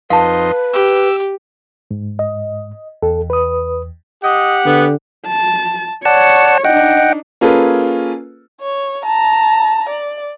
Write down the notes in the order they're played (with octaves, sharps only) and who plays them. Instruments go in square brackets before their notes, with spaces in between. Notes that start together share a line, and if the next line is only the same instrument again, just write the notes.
[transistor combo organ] F2 D#4 C6 [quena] B4 [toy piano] F5 A5
[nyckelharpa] G4 [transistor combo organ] E6
[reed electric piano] G#2
[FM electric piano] D#5
[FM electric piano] E2 [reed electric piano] A4
[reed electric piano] B4 D#6
[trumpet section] G4 F#5 [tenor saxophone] D#5
[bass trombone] D3 [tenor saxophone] B3
[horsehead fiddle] A5
[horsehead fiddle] C#5 [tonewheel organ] D5 F#5 A5
[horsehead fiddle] D4 D#4 [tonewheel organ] D#5 F#5 G5
[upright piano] A#3 C#4 F4 G#4 A4 B4
[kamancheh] C#5
A5 A#5
D5